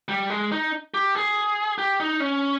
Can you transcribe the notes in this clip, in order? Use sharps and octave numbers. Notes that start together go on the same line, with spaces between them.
G3
G#3
D#4
G4
G#4
G4
D#4
C#4